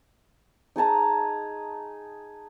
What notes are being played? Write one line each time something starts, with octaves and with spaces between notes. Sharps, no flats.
D#4 G#4 A5 A#5